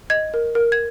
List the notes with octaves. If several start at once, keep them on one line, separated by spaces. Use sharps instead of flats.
D#5 G#6
A#4
A#4
G#6